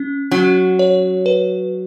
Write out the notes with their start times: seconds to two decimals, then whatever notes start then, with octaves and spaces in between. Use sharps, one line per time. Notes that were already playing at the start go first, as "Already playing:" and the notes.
Already playing: C#4
0.31 F#3 C#4
0.79 C#5
1.26 B4